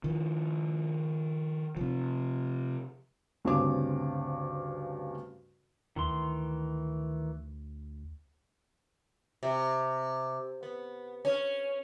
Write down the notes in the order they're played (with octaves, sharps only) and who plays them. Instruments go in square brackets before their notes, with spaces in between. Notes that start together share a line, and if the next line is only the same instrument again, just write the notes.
[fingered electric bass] D#3 F3
C3 F3
[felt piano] D2 G2 C#3 C4 C#4 D6
[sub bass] D2 [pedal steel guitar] D#3 E3 C6
[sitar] C3
B3
C#4